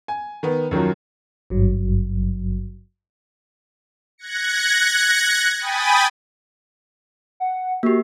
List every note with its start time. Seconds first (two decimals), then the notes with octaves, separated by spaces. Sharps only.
0.08 G#5
0.43 D#3 B3
0.71 F#2 D#3 F3 F#3
1.50 G#1 G2 F#3
4.18 F#6 G#6 A#6 C#7
5.58 G5 G#5 B5 D#6 A6
7.40 F#5
7.83 A#3 F#4 G4